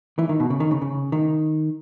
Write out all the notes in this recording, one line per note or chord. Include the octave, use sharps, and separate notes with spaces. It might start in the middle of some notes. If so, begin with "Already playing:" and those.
E3
D#3
B2
C#3
D#3
C#3
C#3
D#3